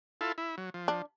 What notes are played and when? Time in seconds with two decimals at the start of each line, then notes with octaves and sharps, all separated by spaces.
0.21 E4 F4 A4
0.38 E4
0.58 F#3
0.74 F3
0.88 D4